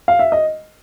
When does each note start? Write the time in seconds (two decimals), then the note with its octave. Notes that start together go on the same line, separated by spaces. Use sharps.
0.08 F5
0.19 E5
0.32 D#5